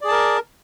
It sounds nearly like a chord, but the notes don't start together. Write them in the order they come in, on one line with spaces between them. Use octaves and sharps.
D5 G#4 A5 A#4